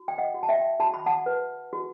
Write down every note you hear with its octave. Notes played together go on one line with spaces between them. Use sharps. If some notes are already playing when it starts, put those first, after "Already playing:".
Already playing: F#4
G5
D#5 F#5
F#4
A5
E5 G5
F#4 A5
B5
F#5 A5
B4
F#4